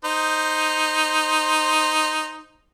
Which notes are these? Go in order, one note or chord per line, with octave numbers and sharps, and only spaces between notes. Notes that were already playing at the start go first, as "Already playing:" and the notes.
D#4 C5